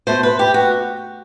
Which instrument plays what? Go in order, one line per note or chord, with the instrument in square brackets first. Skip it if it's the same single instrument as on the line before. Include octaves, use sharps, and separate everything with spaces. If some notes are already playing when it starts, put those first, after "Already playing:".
[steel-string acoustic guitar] B2 A3 C5
B4
G4
F#4